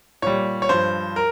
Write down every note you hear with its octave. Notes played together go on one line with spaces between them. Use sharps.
A#2 G3 C#5
C#5
G2 F3 C5
A#4